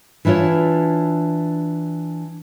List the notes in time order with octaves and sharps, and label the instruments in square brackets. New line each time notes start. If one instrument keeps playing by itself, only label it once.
[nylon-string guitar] E3 D4 E4 F4 C#5